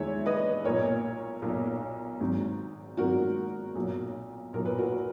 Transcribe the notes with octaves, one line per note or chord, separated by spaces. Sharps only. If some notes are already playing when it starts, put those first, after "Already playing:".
Already playing: E2 D#3 G#3 C#5 E5
B4 D#5
B1 A#2 A#3 A#4 C#5
B1 A#2 A#3
G#1 G#2 F#3
G#1 G#2 F#3 F#4 A#4
B1 A#2 F#3
B1 A#2 F#3 A#4
B4
F#4 A#4